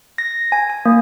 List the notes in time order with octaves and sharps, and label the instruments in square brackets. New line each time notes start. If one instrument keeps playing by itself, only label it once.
[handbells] A#6
G#5
G#5
A#3